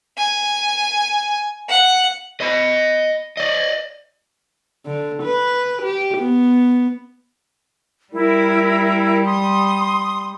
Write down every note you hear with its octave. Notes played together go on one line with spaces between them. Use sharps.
G#5
F#5
D#5 B5
D5 D#5
D3
B4
G4
B3
G3 E4 A#4
C6 D#6